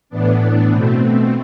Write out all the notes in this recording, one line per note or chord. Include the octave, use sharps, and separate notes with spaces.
A2 E3 B3 D4
B2 A3 C4